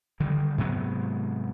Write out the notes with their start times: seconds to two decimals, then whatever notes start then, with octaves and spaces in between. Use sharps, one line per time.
0.20 D3 D#3 G3
0.58 G#2 C3 F#3 B3